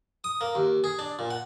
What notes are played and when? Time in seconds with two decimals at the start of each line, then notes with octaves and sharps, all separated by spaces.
0.24 D#6
0.41 A#3
0.55 D#2
0.84 G#4
0.99 D4
1.19 A#2
1.30 F#5